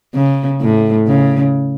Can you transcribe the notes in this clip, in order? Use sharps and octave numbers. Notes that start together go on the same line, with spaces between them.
C#3
A2
C#3